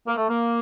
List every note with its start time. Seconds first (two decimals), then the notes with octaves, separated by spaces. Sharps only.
0.07 A#3
0.17 A3
0.29 A#3